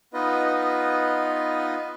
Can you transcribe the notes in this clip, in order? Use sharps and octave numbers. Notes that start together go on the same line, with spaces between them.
B3 D#4 F4 B4 D#5